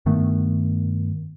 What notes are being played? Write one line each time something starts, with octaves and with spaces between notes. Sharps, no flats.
G2 D#3 A3 B3